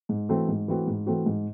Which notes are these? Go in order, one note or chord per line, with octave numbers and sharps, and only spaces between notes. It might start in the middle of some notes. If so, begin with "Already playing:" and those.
G#2
E3 A3 C4 F#4
G#2
E3 A3 C4 F#4
G#2
E3 A3 C4 F#4
G#2